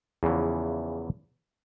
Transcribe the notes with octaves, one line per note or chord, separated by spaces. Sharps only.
E2 C#3 E3 F3